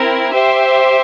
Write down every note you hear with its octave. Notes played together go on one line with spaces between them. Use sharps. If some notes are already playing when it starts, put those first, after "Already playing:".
Already playing: C4 E4 A#4
G4 C5 E5